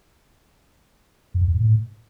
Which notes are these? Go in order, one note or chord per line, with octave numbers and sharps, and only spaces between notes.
F#2
F2
E2
G2
A2